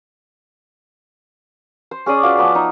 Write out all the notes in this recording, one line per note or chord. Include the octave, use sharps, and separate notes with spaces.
C5
C#4 G#4 D5 D#6
F4 F#4 B4 D6
F3 B3 B4 A5
D#4